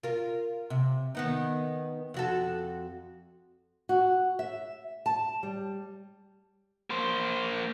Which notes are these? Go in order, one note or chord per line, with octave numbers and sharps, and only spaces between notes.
F4 A#4
C3
D#3 B3 D#4
F2 F#4 A4
F#4
E5
A5
G3
A#3 C5